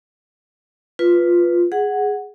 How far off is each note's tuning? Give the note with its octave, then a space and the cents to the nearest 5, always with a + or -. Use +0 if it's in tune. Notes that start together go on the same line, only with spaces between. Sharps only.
F4 +0 B4 +0
G#4 +0 F#5 +0